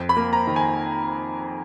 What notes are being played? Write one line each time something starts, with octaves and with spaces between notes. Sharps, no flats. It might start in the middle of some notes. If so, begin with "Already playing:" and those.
Already playing: F2
B5
A#3
A#5
D#3
G#5